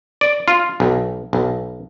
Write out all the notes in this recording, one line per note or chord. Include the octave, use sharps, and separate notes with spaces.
D5
F4
B1
B1